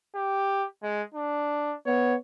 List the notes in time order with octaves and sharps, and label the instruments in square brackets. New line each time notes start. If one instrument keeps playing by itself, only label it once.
[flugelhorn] G4
G#3
D4
[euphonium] B3 [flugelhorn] C#5